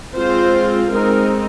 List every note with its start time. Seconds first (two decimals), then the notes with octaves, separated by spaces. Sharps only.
0.15 G#3 C4 F4 C5
0.91 G#3 C4 D#4 A#4